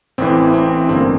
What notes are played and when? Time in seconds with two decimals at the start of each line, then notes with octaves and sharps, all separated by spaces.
0.18 A1 A2 E3 C4
0.54 C4
0.89 A1 G2 D3 C4
0.96 A#3